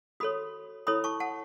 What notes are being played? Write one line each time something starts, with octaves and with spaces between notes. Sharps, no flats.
F#4 A4 C#5 B5 D#6
E4 A4 C#5 B5 D#6
A5 C#6
F#5 A5